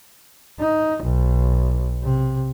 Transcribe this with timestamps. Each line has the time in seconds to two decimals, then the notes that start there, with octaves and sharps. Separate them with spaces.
0.59 D#4
1.03 B1
2.03 C3